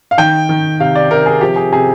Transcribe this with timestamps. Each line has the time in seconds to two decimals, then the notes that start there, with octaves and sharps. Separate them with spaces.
0.11 F5
0.18 D#3 G5
0.49 D#3
0.80 C3 F5
0.95 D5
1.10 C3 A#4
1.26 G#4
1.41 F3 G4
1.56 G#4
1.72 C3 G#4